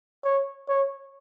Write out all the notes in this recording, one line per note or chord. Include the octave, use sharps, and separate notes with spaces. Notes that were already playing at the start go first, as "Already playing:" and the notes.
C#5
C#5